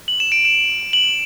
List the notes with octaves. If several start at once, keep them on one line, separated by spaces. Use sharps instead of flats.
F#7
E7
D7
E7
F#7